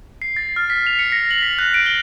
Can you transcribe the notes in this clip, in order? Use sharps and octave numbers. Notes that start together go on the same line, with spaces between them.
C7
A6
F6
B6
F7
C#7
A#6
F#7
B6
F#6
D7
G7